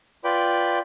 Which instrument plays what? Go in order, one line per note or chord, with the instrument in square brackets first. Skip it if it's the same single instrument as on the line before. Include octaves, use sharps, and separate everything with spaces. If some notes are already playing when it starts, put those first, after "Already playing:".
[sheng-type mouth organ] F4 B4 D5 G5 B5